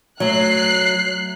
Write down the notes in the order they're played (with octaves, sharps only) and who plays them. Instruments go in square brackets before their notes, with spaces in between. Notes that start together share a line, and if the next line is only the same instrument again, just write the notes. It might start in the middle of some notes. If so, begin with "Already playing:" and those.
[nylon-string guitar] F#3 A3 [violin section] F#6 C7